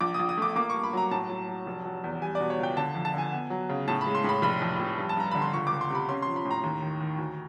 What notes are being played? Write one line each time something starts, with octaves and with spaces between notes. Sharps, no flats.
A#1 D6
D#6
A#1
D#6
A3 D6
A#3 D6
C#6
G2
B5
F#3 A#5
A2 A5
F#3
F#3
F1
F#3
E2
G3 G#5
D5
B2
C#5
C#2 G5
D3 A5
F2
A5
D3 G#5
B3
F#3
C#3
A2 A5
B5
G#3
C6
A2 B5
F1 B5
F2
F1
G2
A5
G2 A#5
D3 B5
C6
C#2 C#6
D6
C#2
C6
C3 B5
C#4 C6
F3 C6
B5
A2
A#5
D#2
D#3
D#3
D2